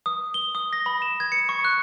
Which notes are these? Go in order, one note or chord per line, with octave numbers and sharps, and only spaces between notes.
D#6
G7
D#6
A#6
B5
E7
G#6
C#7
C#6
F#6